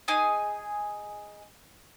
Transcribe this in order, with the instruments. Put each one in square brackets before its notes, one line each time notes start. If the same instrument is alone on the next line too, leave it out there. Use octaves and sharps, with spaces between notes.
[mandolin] D#4 G#4 G#5